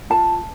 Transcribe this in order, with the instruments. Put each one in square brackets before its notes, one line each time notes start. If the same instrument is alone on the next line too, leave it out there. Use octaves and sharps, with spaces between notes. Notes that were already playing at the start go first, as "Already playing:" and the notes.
[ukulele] F4 A5